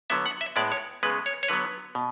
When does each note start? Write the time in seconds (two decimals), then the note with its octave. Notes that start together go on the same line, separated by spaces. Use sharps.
0.10 D3 F#3 B3 E5
0.26 F#5
0.41 E5
0.56 A2 G#3 B3 D5
0.72 C#5
1.03 C#3 G#3 B3 B4
1.26 C#5
1.43 C#5
1.48 D3 F#3 B3 B4
1.95 B2